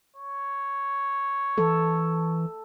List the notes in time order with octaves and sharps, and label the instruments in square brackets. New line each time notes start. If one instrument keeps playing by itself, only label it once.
[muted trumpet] C#5
[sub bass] E3 [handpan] A4